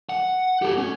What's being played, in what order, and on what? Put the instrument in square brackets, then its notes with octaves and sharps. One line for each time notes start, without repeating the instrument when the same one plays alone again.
[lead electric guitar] F#5
G4 A4
C#4